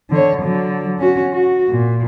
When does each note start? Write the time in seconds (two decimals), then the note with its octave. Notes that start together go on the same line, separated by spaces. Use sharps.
0.10 D3 C#5
0.42 D3 F#3
0.99 C#4 F#4
1.33 F#4
1.70 A#2